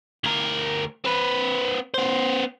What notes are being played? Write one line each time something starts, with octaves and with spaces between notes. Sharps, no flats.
D2 A#4
C4 B4
B3 C5